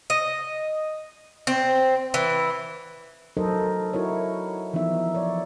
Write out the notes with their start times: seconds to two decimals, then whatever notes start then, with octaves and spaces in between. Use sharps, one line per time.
0.10 D#5
1.47 C4
2.14 E3
3.37 F#3 D#4 A4 A#4 C5 D#5
3.93 D#4 E4 F#4 A#4 C#5
4.73 E3 F3 B3 D#4 E5
5.14 C#5 D5